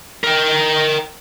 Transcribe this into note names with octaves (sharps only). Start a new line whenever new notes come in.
A#4 G5